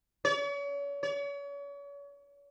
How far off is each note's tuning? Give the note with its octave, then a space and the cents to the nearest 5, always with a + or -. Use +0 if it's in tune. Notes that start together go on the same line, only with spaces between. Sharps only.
C#5 +40
C#5 +40